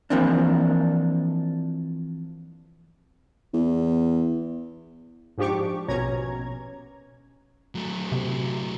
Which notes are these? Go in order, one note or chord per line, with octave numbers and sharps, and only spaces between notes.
E3 F3 A#3 C4 D4
E2
G#2 F3 D4 G4 C#6 D6
A#1 B2 C#4 C#5 A#5 G#6
F#3 A3
C3